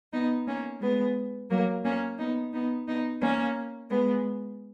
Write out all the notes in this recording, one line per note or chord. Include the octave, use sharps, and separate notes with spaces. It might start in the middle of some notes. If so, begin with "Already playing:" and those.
B3 D#4
A#3 C#4
G#3 B3
F#3 A#3
A#3 C#4
B3 D#4
B3 D#4
B3 D#4
A#3 C#4
G#3 B3